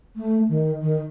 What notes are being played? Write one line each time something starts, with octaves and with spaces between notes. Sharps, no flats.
A3
D#3
D#3